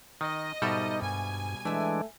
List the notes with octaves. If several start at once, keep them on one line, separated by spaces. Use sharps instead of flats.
D#3 D#5
G#2 B2 G3 D#4 A4 A#4 E5
G2 G#5
E3 G#3 A3 D4 E5